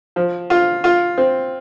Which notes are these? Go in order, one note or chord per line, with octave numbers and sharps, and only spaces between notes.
F3
F4
F4
C4